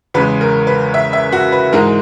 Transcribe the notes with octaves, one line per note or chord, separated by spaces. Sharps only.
E2 C#3 G#3 B4
A#4
B4
E5
E5
F#4
B4
G#2 E3 G#3 A#4